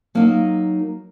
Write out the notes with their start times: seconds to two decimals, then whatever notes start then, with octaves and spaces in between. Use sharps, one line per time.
0.15 F#3 A#3 D#4